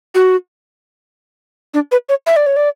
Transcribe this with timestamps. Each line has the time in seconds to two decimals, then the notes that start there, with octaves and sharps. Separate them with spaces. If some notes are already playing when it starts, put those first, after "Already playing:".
0.15 F#4
1.74 D4
1.91 B4
2.09 C#5
2.27 E5
2.36 D5
2.46 C#5
2.56 D5